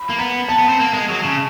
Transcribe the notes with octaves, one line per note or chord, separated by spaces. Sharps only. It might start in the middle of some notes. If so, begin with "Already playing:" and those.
Already playing: B5
A#3
B3 A#5
B3 A5
B3
C4
A#3
G#3
F#3
C#3